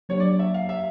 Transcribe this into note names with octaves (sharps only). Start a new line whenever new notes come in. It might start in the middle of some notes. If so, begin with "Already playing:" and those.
F#3 A#3 D4 G4 C#5
D5
E5
F5
E5